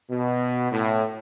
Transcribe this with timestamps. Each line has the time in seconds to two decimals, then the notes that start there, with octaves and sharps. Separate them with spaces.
0.09 B2
0.71 A2